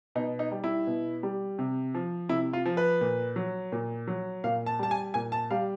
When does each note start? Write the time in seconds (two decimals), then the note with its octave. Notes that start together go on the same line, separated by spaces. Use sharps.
0.15 B2 D#4
0.39 D#4
0.52 G3
0.64 E4
0.87 B2
1.23 G3
1.59 C3
1.95 F3
2.29 C3 E4
2.53 F4
2.66 F3
2.77 B4
3.01 A#2
3.36 F#3
3.72 A#2
4.07 F#3
4.44 A#2 F5
4.66 A5
4.79 G3 A5
4.91 G#5
5.14 A#2 G#5
5.32 A5
5.51 G3 F5